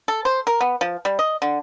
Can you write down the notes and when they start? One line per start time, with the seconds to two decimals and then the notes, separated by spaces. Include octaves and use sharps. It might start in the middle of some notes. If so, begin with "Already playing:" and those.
0.08 A4
0.25 C5
0.47 A#4
0.61 B3
0.81 F3
1.05 G3
1.19 D#5
1.42 D3